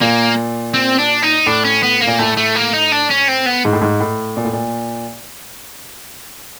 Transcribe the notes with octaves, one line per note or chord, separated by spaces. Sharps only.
A#2 A#3
C4
D4
D#4
A2 D4
C#4
B3
A#3
A#2
A2 A3
A3
A#3
D#4
D4
C#4
C4
B3
G#2
A2
G#2
A2
A#2
A2
A#2